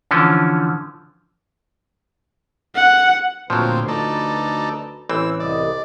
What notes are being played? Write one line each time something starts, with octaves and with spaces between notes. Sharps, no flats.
D3 E3 F3 C#4
F#5
D2 A#2 F3 F#3 C4 F#4 B4
D#4 A4 D5
A1 E3 C4 E6
C2 D5 D#5